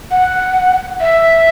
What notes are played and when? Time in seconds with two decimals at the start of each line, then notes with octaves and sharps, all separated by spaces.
0.11 F#5
1.00 E5